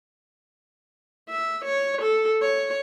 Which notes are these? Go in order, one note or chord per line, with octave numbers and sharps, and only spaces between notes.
E5
C#5
A4
C#5